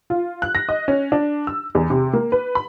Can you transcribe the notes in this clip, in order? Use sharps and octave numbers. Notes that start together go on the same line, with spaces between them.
F4
F#6
A#6
D#5
C#4
D4
E6
E2
C3
A#3
B4
B5